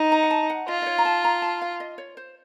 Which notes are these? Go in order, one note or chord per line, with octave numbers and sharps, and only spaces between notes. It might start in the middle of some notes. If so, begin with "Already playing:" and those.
Already playing: D#4
A#5
F#5
A5
F#5
F4 D#5
D#5
C#5
A#5
A5
A#5
A5
F5
D#5
C#5
C5